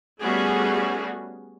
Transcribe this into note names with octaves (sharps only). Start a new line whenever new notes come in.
G3 A3 B3 C#4 F#4 G#4